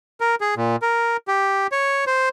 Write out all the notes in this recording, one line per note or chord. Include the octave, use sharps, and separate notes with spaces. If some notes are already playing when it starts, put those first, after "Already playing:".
A#4
G#4
A#2
A#4
G4
C#5
C5